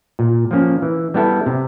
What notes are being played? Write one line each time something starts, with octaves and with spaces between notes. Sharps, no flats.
A#2
F3 A#3 C#4
E3
G3 B3 E4 A4
C3